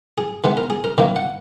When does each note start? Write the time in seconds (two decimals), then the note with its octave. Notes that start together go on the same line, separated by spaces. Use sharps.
0.18 G#4
0.44 D#3 G#3 B3 B4
0.57 A#4
0.70 G#4
0.84 A#4
0.98 D#3 F#3 A#3 B4
1.16 F#5